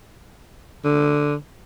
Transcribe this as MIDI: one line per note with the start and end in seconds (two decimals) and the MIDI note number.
0.84 1.35 50